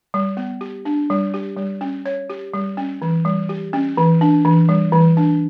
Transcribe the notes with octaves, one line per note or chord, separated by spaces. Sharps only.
G3
B3
G4
D4
G3
G4
G3
C#4
C#5
G4
G3
C#4
E3
G3
G4
C#4
E3
D4
E3
G3
E3
D4